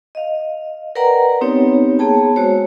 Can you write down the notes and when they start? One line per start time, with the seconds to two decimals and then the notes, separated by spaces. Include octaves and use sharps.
0.15 D#5 F5
0.95 A#4 B4 D5 F#5 G5 A#5
1.41 B3 C4 D#4 G4 C#5
1.99 A#3 B3 G#4 C#5 G5 A5
2.36 G#3 F#4 C5 C#5